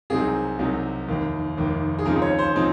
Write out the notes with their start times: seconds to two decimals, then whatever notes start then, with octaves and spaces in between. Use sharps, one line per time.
0.10 C2 C3 F#3 C4 D#4 G#4
0.59 C2 C3 F#3 C4 D#4
1.08 F1 D#2 D#3
1.57 F1 D#2 D#3
1.99 G#4
2.06 D#2 C#3 F3 C4 D#4 A#4
2.22 C#5
2.39 C5
2.55 C#3 F3 C4 D#4